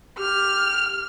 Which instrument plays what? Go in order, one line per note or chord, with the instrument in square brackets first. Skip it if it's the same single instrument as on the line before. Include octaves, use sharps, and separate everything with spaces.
[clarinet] G4 [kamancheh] F6